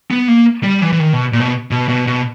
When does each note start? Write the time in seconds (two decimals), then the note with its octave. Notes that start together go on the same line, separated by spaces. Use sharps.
0.11 B3
0.28 A#3
0.63 G3
0.82 E3
0.92 E3
0.99 D#3
1.13 B2
1.33 A#2
1.40 B2
1.71 B2
1.88 B2
2.07 B2